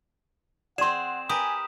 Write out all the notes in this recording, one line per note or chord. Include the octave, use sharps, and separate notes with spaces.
C4 G#4 D5 F#5 C6 E7
G4 A#4 B4 G#5 D#6